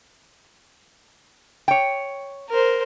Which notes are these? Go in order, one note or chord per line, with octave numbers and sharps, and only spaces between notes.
C#5 G5
A#4 C5